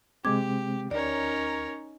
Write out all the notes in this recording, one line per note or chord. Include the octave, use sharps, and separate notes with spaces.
C3 G#3 C4 G4 D6 G#6
D2 C#4 D#4 A#4 C#5 D5